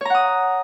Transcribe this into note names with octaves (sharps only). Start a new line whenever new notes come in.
C#5 F#5 A#5 D#6